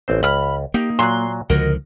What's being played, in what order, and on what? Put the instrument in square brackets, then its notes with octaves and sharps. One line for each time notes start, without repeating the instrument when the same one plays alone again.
[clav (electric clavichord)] A1 C4 C5
[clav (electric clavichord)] C#2 [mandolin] B5 F6
[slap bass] A#3 [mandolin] D#4 [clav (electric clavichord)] G4
[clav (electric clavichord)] A#2 F#3 [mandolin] C6 F#6
[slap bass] C#2 D3 F3 [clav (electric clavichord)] F#4 [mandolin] A#4 D#5